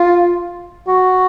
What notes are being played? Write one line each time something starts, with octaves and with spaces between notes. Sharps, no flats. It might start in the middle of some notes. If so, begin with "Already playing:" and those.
Already playing: F4
F#4